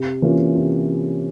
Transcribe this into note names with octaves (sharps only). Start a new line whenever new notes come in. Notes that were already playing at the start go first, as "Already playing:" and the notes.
Already playing: C3
E3 A#3 C#4 F4
C3